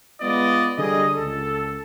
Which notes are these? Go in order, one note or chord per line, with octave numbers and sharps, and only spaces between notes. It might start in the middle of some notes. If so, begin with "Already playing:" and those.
G#3 B3 F4 D5 D#5
D3 G3 G#4 D#5
C#2 A4